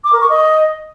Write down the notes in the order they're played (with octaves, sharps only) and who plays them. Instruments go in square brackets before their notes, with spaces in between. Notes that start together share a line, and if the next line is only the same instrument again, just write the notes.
[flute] D6
A#4
C#6
D#5